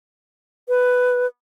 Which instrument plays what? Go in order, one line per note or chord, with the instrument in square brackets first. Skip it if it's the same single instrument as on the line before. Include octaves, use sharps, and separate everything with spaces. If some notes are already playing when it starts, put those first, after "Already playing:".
[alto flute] B4